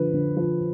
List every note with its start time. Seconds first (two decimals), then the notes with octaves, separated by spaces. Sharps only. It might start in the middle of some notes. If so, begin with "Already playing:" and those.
Already playing: D3 F3 B4
0.13 D3
0.37 F3